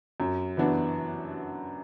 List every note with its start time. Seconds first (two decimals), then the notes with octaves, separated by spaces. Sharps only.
0.20 F#2
0.57 E3 B3 D4 F#4